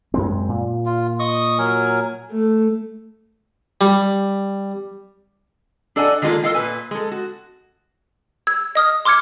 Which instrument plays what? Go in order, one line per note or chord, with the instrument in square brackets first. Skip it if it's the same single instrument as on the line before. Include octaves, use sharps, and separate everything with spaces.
[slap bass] F#2 G#3 C4
A#2
[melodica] F4
D#5 C#6 D#6
F#3 A#4 G#5
[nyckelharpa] A3
[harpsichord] G3
[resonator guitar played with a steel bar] D4 A4 D5 D#5 F#5 G#5
D#3 G#3 A#3 F4 G#4 A4
F4 A4 A#4 D#5 F5 G5
A#2 B4 G#5
G#3 A4
F#4
[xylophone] E6 G#6
D#5 D#6 F6
C6 D6 F6 G#6 C#7